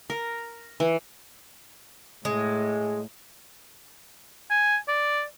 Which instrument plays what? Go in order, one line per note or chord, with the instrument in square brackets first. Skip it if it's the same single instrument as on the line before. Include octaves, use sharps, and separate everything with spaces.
[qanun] A#4
E3
[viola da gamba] A2 [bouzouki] G#3
[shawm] G#5
D5